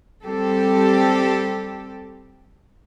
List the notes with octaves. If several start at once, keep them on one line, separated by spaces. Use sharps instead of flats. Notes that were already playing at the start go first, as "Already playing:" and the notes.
G3 C4 G4 A4